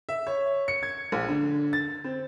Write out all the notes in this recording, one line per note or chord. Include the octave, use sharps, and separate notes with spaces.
E5
C#5
C#7
G#6
A#1
D3
A6
C4